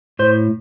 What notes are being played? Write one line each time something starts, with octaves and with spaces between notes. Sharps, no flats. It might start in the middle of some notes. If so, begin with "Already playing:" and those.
A2 C5